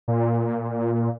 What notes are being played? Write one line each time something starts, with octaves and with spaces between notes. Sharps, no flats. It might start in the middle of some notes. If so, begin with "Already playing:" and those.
A#2